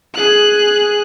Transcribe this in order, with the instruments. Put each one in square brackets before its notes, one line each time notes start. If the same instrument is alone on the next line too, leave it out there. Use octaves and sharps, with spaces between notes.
[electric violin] G#4 F#6